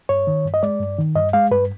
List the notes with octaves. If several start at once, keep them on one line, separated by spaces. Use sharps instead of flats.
G2 C#5
D#3
G2
D#5
G#3 D5
G2
D#3
G2 D#5
G#3 F5
G2 B4